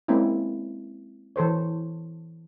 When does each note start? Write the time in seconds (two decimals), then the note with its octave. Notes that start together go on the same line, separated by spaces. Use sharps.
0.08 G#3 A#3 C4 C#4 E4
1.36 E3 A4 C5 C#5